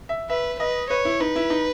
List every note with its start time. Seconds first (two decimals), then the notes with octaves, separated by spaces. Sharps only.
0.09 E5
0.30 B4 E5
0.59 B4 D#5
0.90 B4 C#5
1.05 E4
1.20 D#4 B4
1.36 E4
1.50 D#4